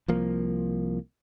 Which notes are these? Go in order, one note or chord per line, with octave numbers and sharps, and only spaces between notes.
C2 F3 A#3